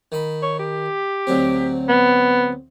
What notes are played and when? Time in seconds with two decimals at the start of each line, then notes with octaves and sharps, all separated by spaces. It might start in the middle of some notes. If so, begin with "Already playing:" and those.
0.12 D#3 B5
0.42 C#5
0.59 G4
1.27 D2 F#3 C4
1.88 B3